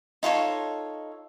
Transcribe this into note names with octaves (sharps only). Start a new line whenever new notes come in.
D#4 F4 A4 C#5